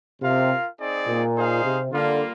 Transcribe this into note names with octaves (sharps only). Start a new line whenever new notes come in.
C3 F4 A#4 F5
C4 D#4 G#4 D5
A#2
D#4 G#4 C5 F5
C3
D3 G3 A#3 F4